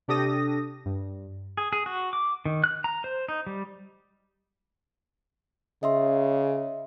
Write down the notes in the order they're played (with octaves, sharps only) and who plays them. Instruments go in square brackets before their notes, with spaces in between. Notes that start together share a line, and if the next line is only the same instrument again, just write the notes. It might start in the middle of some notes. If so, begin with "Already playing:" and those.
[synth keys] C3 D4 G4 A4 D#6 A#6
G2
[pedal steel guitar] G#4
G#4
F#4
D6
D#3
F#6
A#5
C5
D#4
G3
[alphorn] C#3 [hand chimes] D#5 E5 C6